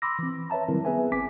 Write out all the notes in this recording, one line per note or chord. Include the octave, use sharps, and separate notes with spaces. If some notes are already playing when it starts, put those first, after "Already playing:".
B5 C6 D6 E6 A#6
E3 C4
B4 C#5 E5 A5 A#5
D#3 F#3 G3 C4 E4 A#4
B3 G#4 B4 E5 G#5
G1 C4 G#5 D6 B6